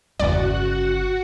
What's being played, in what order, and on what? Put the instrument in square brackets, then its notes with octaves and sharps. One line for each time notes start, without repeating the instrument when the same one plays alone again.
[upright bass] G1 C#3 [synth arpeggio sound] E2 D5 [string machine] F#4 F#5